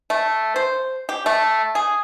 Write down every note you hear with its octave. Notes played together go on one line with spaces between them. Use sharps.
A3
C5
G4
A3
G#4